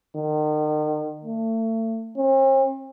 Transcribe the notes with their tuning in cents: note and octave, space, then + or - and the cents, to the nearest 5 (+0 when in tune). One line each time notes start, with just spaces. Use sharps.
D#3 -35
A3 +35
C4 +45